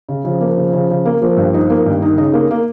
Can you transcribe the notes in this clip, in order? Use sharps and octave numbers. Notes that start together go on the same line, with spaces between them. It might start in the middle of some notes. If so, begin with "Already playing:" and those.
C#3
C#3 F3
A#3
C#3
C#3
C#3
A#3
F3 A#3
G2
F3 D#4
A#3
G2 D#3
D#4
C#3 D#4
A#3
A#3